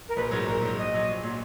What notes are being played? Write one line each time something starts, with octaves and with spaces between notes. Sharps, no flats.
A#4
A#1 B4
G#2 F#3 A#4
A#1 A#4
G#2 F#3
A#1 D#5
A#2 F#3
A#1
A#2 F#3